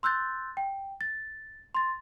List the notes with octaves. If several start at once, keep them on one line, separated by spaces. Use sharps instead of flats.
C6 E6 F#6 G6 A6
G5
A6
C6 A6